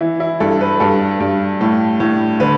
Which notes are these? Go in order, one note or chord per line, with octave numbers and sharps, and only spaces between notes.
E3 E4
E4
G2 A4
B4
G2 A4
G2
A2
A2
D3 B4